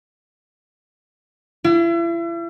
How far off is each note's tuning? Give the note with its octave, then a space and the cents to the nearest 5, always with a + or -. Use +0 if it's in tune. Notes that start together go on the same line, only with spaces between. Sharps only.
E4 +40